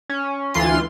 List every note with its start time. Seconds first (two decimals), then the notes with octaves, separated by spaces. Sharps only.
0.10 C#4
0.54 D2 E3 F4 C6